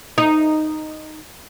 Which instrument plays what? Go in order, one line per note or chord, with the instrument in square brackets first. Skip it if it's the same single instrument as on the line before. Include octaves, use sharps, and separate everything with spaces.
[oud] D#4